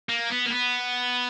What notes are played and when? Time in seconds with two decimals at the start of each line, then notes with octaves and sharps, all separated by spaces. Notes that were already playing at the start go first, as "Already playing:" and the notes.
0.09 A#3
0.30 B3
0.46 A#3
0.50 B3